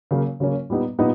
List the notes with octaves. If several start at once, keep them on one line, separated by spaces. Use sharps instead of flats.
C#3 F#3 A#3 C#4
C#3 F#3 A#3 C#4
A#2 G3 B3 D#4
A#2 G3 B3 D#4